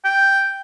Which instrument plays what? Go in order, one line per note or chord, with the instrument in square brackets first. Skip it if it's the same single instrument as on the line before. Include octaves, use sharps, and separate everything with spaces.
[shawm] G5